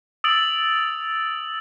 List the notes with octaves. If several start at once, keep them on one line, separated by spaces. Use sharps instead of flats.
D#6 E6 A6 D7 F#7